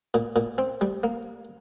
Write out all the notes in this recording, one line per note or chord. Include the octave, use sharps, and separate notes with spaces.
A#2
A#2
C4
G3
A#3